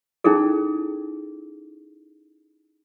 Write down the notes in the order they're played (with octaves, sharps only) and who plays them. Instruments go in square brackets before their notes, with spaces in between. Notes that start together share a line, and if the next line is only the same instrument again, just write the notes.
[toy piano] C#4 D#4 E4 G#4 A4